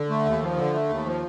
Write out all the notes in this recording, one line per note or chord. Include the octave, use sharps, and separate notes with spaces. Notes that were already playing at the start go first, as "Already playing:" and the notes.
Already playing: D3
A3
D#2
F3
D3
A3
D#2
F3